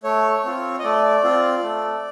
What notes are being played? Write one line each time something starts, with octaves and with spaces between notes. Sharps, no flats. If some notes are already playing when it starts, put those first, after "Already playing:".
A3 C#5
C4 F4
D#5
A3 D5
C4 F4
A3